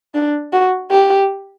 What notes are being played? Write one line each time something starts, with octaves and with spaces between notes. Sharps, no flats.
D4
F#4
G4